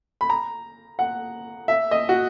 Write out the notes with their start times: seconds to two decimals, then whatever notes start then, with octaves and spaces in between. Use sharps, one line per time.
0.21 B5
0.30 A#5
0.99 F#5
1.68 E5
1.91 D#5
2.09 F#4